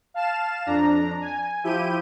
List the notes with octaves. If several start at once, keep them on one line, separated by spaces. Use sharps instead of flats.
F5 A5 F6 E7
F2 D4 A#5
G#5
F3 E4 G4 G6 D#7